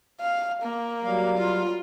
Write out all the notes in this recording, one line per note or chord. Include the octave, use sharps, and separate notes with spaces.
F5
A#3
F#3 G3 F5
F4